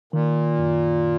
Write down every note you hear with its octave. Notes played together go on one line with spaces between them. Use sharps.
A#2 D#3
F#2